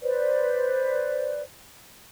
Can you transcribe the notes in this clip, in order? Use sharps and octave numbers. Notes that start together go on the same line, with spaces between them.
B4 C5 D5